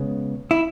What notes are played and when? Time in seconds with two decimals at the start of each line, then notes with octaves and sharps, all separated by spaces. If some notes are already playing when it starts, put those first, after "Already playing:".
Already playing: C#3 G#3 B3
0.51 E4